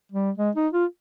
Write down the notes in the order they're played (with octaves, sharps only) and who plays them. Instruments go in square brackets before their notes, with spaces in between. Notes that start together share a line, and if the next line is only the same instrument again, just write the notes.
[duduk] G3
G#3
D#4
F4